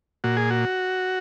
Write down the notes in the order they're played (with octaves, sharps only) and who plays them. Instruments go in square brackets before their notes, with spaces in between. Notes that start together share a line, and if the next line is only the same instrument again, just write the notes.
[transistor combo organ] A#2 F#4
G#4
F#4